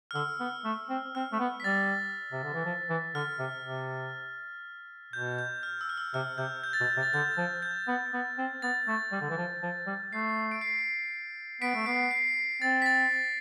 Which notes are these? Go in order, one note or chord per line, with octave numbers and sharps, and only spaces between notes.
F6
D3 E6
B3
A3
C4
C4 F6
A3
B3
B6
G3 A6
C3
D3
E3
F3
E3
D3 F6
C3
C3
B2 G6
G6
F6
E6
F6
E6
C3 F6
C3 G6
G6
A6
B2
G6
C3
A6
D3 G6
F3
G6
B3
B3
C4
B3 A6
A3
G3
D3
E3
F3
F3
G3
A3 C7
D7
C7
B3 B6 D7
A3
B3 C7
C7
C4 A6
B6
A6